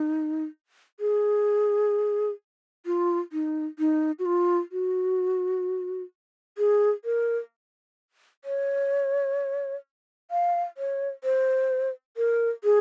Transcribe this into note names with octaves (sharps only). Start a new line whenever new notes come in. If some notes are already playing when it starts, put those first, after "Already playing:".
Already playing: D#4
G#4
F4
D#4
D#4
F#4
F4
F#4
G#4
A#4
C#5
F5
C#5
C5
A#4
G#4